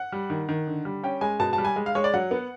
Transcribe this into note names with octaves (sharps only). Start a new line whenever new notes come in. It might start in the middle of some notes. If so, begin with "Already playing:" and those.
Already playing: F#5
G3
D#3
D#3
D3
G3
C#4 G5
G#3 G#5
B2 A5
A5
G3
G#5
G#3
F5
G#3 C#5
D5
F#3 F#5
B3